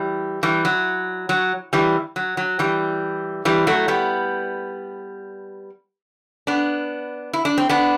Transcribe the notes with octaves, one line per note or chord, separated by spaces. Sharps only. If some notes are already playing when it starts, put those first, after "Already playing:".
Already playing: E3 G3
E3 G3
F#3
F#3
E3 G3
F#3
F#3
E3 G3
E3 G3
F#3 A3
G3 B3
B3 D4
E4
D4
C4
B3 D4